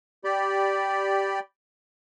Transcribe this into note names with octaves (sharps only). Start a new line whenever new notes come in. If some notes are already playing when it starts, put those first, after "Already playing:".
G4 D5 B5